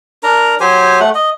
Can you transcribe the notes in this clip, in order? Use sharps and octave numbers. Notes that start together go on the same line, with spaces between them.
D4 A#4 A#5
F#3 G4 C5 G#5
A3 F#5
D#5